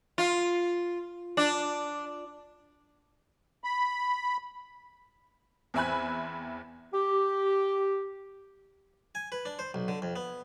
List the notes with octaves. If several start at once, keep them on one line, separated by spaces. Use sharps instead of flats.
F4
D4
B5
E2 C4 E5 G#5 B5 F#6
G4
G#5
B4
D4
C5
B1
D3
F2
B3